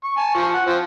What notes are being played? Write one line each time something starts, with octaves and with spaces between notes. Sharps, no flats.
C#6
G#5 A5
F3 C#6
F#5
F3 C4